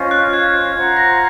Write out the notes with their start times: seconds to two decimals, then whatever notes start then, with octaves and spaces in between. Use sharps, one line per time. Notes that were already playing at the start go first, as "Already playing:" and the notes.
Already playing: C#4 F4 C5 D#5
0.11 F#6
0.33 G#6
0.76 F4 C5 F#5 A#5
0.97 A#6